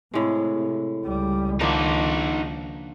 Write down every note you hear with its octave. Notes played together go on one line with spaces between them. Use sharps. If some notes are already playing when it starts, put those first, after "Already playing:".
A2 C3 G#3
C#2 G3
D#3 F3 A#3 D4 D#4 F#4